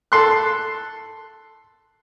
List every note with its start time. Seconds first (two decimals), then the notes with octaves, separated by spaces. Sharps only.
0.12 A4 C6 F#6